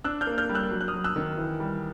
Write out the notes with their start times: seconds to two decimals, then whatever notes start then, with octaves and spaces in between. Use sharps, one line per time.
0.04 D4 E6 F#6
0.21 F6 G6
0.27 A#3
0.38 F6 G6
0.49 G3
0.55 E6 F#6
0.71 F#3
0.81 F#6
0.88 D#6 F6
0.93 F#3
1.04 E6 F#6
1.16 D#3
1.38 E3
1.60 G3